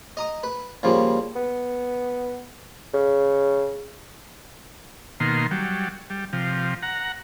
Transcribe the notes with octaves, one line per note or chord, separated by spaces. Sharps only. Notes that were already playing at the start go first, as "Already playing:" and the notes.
D#5 A#5 D#6
B4
A#2 C#3 F3 G3
B3
C#3
B2 D#3 A#3 C6
F#3 G3
G3
C3 F3
F#5 A#5